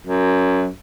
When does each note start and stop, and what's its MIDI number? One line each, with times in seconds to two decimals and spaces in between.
0.07 0.69 42